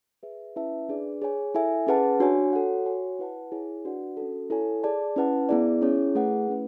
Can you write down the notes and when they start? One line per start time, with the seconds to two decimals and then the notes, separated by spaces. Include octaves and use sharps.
0.23 G#4 B4 E5
0.56 C#4 E4 B4 E5 A5
0.89 D4 G#4 B4 D5
1.22 G#4 C#5 G#5
1.55 E4 A4 E5 G#5
1.87 C#4 G#4 B4 F#5 A5
2.20 D4 F#4 C#5 G#5
2.53 F#4 A4 C#5 F#5
2.86 F#4 C#5 G#5
3.19 E4 B4 F#5 A5
3.52 E4 G#4 C#5 G#5
3.85 D4 F#4 B4 D5 F#5
4.17 C#4 F#4 A4
4.50 E4 A4 C#5 G#5
4.83 G#4 D5 A5
5.16 C#4 E4 B4 F#5 A5
5.49 B3 E4 G#4 D5
5.82 C#4 E4 G#4 C#5
6.15 A3 E4 G#4 B4 F#5
6.48 A3 C#4 E4 B4